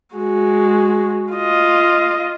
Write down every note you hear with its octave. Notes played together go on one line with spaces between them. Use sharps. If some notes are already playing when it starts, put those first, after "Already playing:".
G#3 F#4
F4 D#5